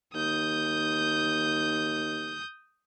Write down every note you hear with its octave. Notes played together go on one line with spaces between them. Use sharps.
D#2 D#6 G6